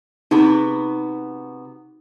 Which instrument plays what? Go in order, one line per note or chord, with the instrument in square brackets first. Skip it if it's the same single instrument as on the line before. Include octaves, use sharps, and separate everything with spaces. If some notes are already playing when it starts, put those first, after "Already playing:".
[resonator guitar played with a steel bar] C3 B3 F#4 [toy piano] D#4 G#4